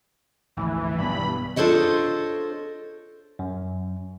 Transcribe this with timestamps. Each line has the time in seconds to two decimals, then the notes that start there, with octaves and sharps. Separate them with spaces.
0.57 G#1 D2 E3 F3
0.98 B1 G2 B3 B5
1.56 D4 F4 A4 C5 C#5 D#5
3.39 F#2